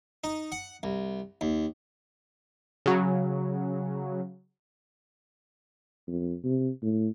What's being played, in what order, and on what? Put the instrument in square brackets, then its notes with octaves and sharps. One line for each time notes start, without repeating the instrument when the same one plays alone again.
[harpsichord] D#4
F#5
C2
D#2
[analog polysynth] C#3 F#3
[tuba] F2
C3
A2